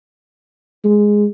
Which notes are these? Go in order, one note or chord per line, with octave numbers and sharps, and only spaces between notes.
G#3